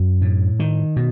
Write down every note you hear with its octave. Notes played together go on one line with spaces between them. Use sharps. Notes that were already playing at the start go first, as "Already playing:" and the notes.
Already playing: F#2 F#3
A2
D#3
B2